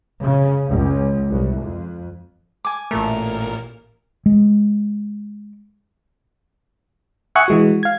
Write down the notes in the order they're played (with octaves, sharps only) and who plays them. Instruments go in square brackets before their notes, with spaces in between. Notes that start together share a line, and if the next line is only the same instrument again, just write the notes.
[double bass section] C#3
C#2
C2
F2
[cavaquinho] G#5 D6
[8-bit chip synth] A1 A#2 A#4 [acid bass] A3
[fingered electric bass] G#3
[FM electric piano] E5 F#5 G#5 C#6 D#6 F#6
E3 G#3 F#4
F5 G#6